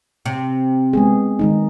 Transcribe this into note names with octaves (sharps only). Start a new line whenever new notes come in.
C3
G#3 B3 G#4
D#3 G#3 D#4